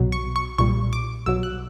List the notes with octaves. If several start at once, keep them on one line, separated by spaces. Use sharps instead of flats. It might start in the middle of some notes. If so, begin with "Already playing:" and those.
Already playing: B1 B2 F#3
C#6
C#6
B1 A#2 G3 C#6
D6
B1 B2 F#3 E6
F#6